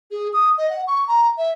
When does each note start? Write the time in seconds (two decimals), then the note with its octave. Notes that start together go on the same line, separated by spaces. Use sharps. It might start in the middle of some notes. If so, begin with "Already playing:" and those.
0.11 G#4
0.33 D#6
0.58 D#5
0.70 F#5
0.87 C#6
1.08 A#5
1.38 E5